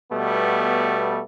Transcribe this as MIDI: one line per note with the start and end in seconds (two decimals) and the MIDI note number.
0.12 1.21 47
0.12 1.21 55
0.12 1.21 57
0.12 1.21 59